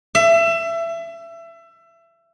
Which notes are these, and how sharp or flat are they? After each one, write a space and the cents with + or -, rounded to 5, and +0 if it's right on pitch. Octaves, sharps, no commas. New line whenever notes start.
E5 +25